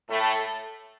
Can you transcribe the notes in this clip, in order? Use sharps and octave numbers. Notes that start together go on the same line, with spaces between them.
A2 A3